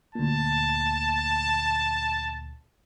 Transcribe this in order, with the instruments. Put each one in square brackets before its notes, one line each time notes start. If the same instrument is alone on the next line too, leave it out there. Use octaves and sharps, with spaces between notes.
[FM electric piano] D2 A#2 [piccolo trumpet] A5